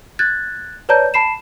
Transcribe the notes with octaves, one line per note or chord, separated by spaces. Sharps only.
F#6 G#6 A6
B4 C#5 D5 A5 A#5 G6
A5 B5 C7 E7